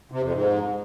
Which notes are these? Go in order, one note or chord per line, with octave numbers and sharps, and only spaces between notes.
C3
F2
G#2